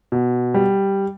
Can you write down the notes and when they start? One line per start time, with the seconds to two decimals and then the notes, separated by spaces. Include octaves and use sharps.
0.12 B2
0.54 G3